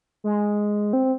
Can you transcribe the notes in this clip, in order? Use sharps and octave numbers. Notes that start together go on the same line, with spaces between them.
G#3
C4